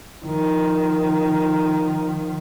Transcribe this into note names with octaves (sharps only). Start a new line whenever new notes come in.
D#3 F3